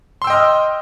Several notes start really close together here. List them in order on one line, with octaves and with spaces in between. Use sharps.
C6 E6 G5 D#5 F6